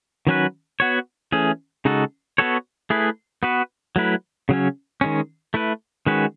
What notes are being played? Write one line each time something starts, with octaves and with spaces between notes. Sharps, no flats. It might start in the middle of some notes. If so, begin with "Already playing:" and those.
D#3 F#3 C#4 F#4 B4
B3 F#4 C#5
E3 A3 C#4 G#4
C#3 G#3 D#4 F#4 A4
B3 F#4 A4 C#5
A3 E4 G#4 B4
B3 F#4 B4
F#3 A3 E4 B4
C#3 F#3 C#4
D#3 G#3 C#4
A3 E4 B4
D#3 G#3 C#4 F#4 B4